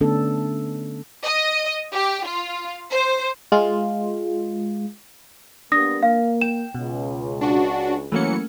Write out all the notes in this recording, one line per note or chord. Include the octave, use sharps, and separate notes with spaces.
D3 A3 B3 C#4 D4 A4
D#5
G4
F4
C5
G#3 F4
G3 A#3 B3 D4 D#6 A#6
A#3 F5
G5 E7
C#2 B2
D4 F#4
E3 F#3 A3 A#3 C#4 C#7